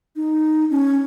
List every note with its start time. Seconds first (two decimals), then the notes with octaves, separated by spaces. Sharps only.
0.16 D#4
0.71 C#4